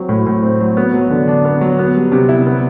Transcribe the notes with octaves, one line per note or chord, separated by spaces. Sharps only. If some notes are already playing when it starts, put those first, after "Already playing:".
Already playing: F#3 C4
A2
A2
C4
F#3
B3
F#3
D3
D4
B3
F#3
B3
G3
C3
E4
B3